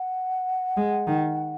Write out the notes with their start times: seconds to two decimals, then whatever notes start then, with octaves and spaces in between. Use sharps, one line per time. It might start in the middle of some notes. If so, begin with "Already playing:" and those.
Already playing: F#5
0.77 G#3
1.07 D#3